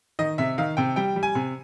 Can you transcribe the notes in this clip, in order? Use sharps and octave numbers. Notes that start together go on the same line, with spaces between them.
D#3 D#5
C3 E5
D#3 F5
C3 G5
G3 G5
G3
G#5
C3